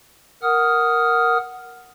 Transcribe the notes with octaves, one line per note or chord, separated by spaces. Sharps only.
A#4 F#5 D#6 F6